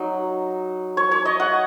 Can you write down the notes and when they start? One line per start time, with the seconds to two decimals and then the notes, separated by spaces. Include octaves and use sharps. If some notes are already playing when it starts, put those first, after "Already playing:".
Already playing: F#3 D#4
0.97 C#5
1.11 C#5
1.25 D#5
1.40 F#5